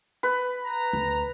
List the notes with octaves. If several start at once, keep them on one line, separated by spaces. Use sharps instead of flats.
B4
A#5
D2